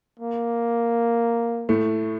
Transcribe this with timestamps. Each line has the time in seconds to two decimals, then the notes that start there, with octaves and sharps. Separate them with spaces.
0.20 A#3
1.69 A2 A3